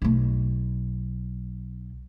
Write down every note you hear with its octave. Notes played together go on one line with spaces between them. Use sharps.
B1 A3